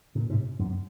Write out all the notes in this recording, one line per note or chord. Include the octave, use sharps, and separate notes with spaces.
A#2 C#3
G#2 C3
F#2